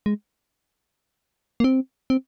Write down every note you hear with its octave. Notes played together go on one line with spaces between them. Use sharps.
G#3
A#3
C4
C4